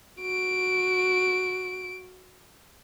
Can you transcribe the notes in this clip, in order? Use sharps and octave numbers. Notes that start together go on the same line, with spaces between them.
F#4 D7